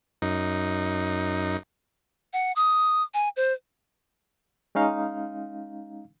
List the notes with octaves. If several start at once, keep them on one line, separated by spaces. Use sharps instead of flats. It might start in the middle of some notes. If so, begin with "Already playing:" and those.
F#2 D#4
F#5
D#6
G#5
C5
G#3 C#4 D#4 F5